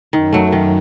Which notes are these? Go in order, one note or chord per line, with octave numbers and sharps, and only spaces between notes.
F#2 D#3
F#3 A3
D#3